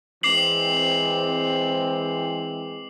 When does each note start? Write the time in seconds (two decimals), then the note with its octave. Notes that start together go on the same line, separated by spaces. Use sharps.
0.23 E3 G#3 C4 D6 C7 F#7